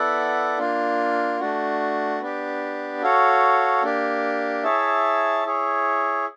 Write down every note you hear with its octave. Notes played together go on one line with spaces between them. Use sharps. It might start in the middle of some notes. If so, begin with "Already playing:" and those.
Already playing: B3 E4 A4 D5 F#5
A#3 D4 F4
A3 D4 F#4
B3 D4 G4
F#4 A4 C#5 F5
A#3 D4 G4
E4 G#4 C#5 E5 A5
E4 G#4 C#5